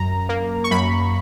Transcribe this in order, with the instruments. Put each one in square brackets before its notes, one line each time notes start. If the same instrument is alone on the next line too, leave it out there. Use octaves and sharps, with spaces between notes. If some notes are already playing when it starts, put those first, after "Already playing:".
Already playing: [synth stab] F#2 A#5
A#3
C#6
F#2 B5